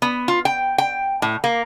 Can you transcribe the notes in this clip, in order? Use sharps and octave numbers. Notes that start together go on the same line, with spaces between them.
B3
F4
G5
G5
A2
A#3